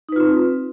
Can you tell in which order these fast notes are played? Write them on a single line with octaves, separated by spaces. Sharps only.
D#4 B4 F4 C4